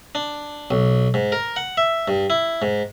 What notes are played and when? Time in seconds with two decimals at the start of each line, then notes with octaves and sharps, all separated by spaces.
0.15 D4
0.71 B1
1.14 G#2
1.32 A#4
1.56 F#5
1.77 E5
2.08 G2
2.30 E4
2.62 G#2